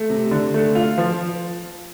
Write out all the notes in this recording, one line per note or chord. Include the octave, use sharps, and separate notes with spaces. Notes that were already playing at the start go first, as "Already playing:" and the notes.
Already playing: A3
C3
D3
A3
F4
F3